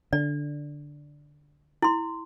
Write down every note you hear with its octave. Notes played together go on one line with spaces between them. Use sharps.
D3 D5
E4 C6